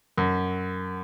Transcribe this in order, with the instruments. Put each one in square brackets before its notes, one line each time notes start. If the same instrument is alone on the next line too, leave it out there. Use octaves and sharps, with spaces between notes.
[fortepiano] F#2